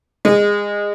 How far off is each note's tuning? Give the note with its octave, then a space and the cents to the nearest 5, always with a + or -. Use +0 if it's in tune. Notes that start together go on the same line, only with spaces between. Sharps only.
G#3 -20